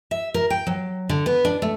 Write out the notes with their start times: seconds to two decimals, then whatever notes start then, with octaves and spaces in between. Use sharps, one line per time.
0.11 E5
0.34 A#4
0.50 G5
0.67 F#3
1.09 D3
1.26 B3
1.45 D4
1.62 A3